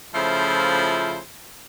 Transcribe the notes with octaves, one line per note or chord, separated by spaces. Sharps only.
C#3 F3 A3 E4 F4 C5